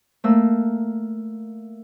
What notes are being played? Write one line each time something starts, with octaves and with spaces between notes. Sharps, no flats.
A3 A#3 E6